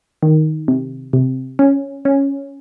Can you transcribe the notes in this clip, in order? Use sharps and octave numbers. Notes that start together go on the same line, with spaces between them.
D#3
C3
C3
C#4
C#4